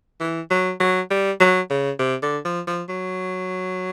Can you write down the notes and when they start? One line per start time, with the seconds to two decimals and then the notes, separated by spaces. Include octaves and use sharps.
0.20 E3
0.51 F#3
0.80 F#3
1.11 G3
1.40 F#3
1.71 C#3
1.99 C3
2.23 D3
2.45 F3
2.68 F3
2.89 F#3